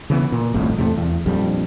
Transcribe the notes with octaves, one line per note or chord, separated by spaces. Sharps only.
C#3 E3 B3
A#2
D#1 G#1 F2 A2
E2 C3 A3
E2
A#1 F2 G3